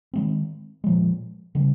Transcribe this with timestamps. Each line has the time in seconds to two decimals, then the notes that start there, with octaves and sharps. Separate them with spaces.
0.13 D#3 G#3 C4
0.84 A#2 F3 G#3
1.55 C#3 G3 C#4